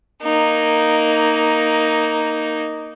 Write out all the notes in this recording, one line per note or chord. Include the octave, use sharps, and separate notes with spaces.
A#3 D#4